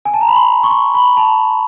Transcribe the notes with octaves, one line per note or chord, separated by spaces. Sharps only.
G#5
A5
A#5
B5
C6
C#6
C6
B5
A5